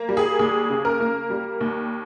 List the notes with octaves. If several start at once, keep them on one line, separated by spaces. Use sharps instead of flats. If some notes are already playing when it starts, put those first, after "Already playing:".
Already playing: A#3
G3
G#4
D#2 G#4
C#3
A#4
A#3
G3
D#2